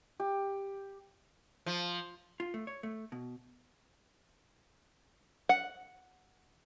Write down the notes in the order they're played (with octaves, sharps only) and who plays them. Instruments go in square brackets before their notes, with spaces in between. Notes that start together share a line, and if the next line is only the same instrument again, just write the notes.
[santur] G4
[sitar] F3
[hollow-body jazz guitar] F4
A3
C#5
A3
B2
[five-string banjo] F#5